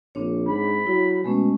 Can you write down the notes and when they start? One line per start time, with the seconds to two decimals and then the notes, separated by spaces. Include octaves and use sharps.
0.15 A#1 C4 D4 C#5
0.48 G#2 B5
0.87 F#3 E4
1.24 B2 G#3 A3 C#4